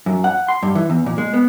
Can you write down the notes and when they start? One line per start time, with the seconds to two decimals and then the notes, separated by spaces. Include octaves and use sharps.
0.06 F#2
0.24 F#5
0.48 C6
0.63 G2
0.75 E3
0.90 E2
1.06 A#2
1.18 G#3
1.33 B3